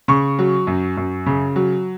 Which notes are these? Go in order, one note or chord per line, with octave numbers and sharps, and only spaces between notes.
C#3 C#6
F#3
F#2
F#2
C#3
F#3